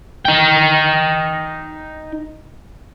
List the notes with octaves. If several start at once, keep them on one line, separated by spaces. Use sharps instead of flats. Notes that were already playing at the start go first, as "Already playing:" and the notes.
D#4 G5